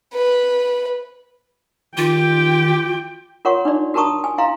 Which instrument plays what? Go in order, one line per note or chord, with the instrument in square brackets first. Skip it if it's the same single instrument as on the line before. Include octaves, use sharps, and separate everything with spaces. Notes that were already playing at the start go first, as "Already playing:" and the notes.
[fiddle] B4
[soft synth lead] D#3 [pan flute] F4 [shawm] G4 [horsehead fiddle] G5
[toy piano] F4 A#4 C#5 F#5 C6 C#6
D4 D#4 D5
F#4 A#4 A5 A#5 C#6 D#6
G#5
E4 F5 A#5 C6